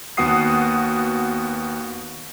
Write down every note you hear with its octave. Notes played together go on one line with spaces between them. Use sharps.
D#2 B3 F#4 F#5 D#6 C7